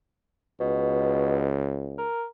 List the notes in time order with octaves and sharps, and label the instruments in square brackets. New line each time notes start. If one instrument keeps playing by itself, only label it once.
[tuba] C#2 [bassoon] B2
[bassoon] A#4